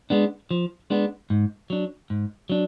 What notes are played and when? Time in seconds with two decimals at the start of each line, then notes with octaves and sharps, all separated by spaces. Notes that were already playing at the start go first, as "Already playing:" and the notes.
0.10 G#3 B3 D4
0.51 F3
0.90 G#3 B3 D4
1.30 G#2
1.70 F#3 D4
2.10 G#2
2.50 F#3 D4